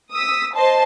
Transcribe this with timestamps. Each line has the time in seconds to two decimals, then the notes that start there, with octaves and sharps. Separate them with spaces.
0.12 D#6 E6 B6
0.53 C5 D#5 A5 C6